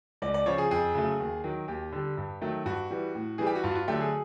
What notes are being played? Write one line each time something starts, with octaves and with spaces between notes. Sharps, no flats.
C#2 D5
D5
C#3 F3 C#5
G#4
F2 G#4
C#3 F#3 A3
D#2
D#3 F#3
D#2 G4
D3 G3
G2
D#3 F#3 A3
G2 F#4
E3 G3
A2
E3 G3 G#4
G4
F#4
G2 F4
F#4
F4
D3 F#3 A3 G4
G#4